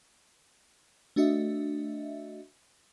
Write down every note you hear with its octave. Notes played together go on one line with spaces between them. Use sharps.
A3 D4 F#4 D#5 E5